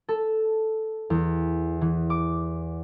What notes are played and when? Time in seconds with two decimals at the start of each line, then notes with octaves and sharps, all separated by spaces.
0.09 A4
1.10 E2
1.81 E3
2.10 D6